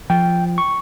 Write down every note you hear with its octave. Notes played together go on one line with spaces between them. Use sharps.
F3 G5
C#6